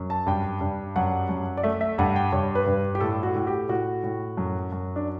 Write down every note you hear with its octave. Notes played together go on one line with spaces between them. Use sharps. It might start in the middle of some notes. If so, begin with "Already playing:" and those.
Already playing: F#2
A5
G2 G5
G2
F#2 F#5
F#2
D5
A3 E5
E5
G2 F#5
G5
G2 C#5
B4
G2
G4
A2 A4
F#4
A2
G4
A2 F#4
A2
F#2
F#2
D4